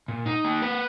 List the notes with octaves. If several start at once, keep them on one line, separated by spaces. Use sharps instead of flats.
A#2
D#4
A#3
B4